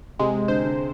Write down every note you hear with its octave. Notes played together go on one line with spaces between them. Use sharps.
C3 G#3
D3 C5
D3